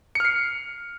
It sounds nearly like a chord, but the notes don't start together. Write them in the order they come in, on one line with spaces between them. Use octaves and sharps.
C#7 F6 C7